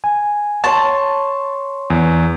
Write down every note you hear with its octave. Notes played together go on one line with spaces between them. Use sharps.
G#5
C#5 A5 C6 C#6
E2